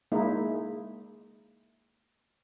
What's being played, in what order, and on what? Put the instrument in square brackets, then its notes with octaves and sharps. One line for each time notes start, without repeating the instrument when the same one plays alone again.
[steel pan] G#3 A#3 D#4 E4